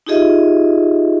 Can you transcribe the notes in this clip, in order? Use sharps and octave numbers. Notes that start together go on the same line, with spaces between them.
D#4 F4 G4 G#4 D#5 E5